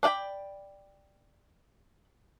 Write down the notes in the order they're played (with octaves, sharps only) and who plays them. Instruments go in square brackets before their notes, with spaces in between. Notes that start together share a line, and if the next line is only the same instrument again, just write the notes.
[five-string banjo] D4 D5 F5 G5 B5